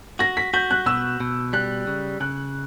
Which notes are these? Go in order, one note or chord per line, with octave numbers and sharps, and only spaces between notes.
F#4 A#6
B6
F#4 G6
F#6
B2 E6
B2
G3 F#6
C#3
C#3 F#6